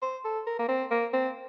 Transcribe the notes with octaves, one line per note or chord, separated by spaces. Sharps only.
C5
A4
A#4
A#3
C4
A#3
C4